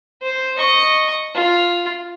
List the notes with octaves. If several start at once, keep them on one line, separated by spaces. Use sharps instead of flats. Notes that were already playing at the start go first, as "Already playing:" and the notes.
C5
D#5 C#6
F4